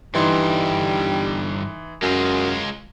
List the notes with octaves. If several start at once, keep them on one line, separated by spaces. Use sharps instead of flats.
G2 D3 E3 G3 D#4 C6
F#2 G#3 F4